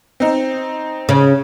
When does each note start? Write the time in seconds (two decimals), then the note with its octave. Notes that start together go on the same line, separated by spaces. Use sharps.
0.20 C4 D#4
1.09 C#3